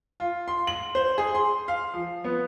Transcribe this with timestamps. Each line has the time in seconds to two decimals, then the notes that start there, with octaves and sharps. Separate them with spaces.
0.20 F4
0.48 C6
0.67 F#7
0.95 C5
1.18 G#4
1.35 C6
1.68 F5
1.94 F3
2.24 B3